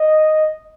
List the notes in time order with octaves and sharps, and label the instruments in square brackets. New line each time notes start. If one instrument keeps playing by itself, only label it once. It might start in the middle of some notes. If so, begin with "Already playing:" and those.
Already playing: [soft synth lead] D#5